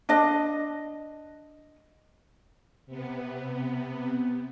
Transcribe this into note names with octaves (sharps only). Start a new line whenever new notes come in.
D4 D#5
C3 B3